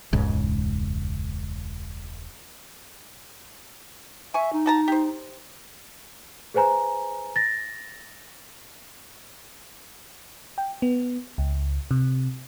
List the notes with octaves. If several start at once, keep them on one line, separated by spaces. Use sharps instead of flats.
E1 C#2 G#2 C#3
E5 G#5 C#6
D#4
F#4 A5 A#5
G4 C5
G#4 B4 C5 G#5 A#5
A6 A#6
G5
B3
C#2
C3